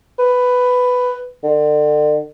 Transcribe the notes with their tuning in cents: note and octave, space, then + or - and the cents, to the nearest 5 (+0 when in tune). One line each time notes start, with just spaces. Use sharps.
B4 +10
D3 +35